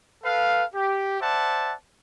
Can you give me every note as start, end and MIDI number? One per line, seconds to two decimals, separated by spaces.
0.24 0.64 69
0.24 0.64 71
0.24 0.64 77
0.74 1.20 67
1.21 1.73 72
1.21 1.73 74
1.21 1.73 76
1.21 1.73 78
1.21 1.73 81